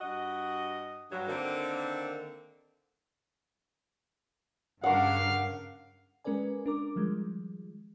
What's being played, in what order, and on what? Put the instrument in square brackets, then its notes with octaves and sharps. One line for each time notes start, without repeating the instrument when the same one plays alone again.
[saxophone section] G2 F#4 D#5
G2 F#3
D3 D#3 A#3 C4
[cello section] G2 C#3 [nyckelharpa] D4 A#4 [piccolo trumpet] F5 [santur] F#5 C#6
[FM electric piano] G#3 C#4 A#4 B4 D5 G#5
D4 A#4 D6
D#3 F3 G3 G#3